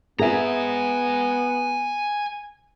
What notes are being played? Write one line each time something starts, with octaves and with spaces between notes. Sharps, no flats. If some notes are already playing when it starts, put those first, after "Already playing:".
B3 G#4 E5 G#5 A#5